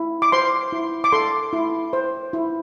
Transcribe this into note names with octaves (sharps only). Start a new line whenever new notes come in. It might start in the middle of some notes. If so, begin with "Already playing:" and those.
Already playing: E4
D6
C5 C6
E4
D6
A4 C6
E4
C5
E4